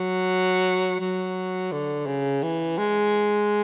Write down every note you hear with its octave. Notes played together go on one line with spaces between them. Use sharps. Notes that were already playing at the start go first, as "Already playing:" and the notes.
Already playing: F#3
F#3
D3
C#3
E3
G#3